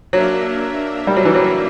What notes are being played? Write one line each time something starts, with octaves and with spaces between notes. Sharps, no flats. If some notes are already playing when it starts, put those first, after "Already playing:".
F#3 A#3 D4 A#4 E5
G3
F#3
E3
F#3